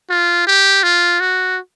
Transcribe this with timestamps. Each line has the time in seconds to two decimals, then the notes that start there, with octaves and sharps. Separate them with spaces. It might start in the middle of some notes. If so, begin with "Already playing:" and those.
0.10 F4
0.47 G4
0.83 F4
1.20 F#4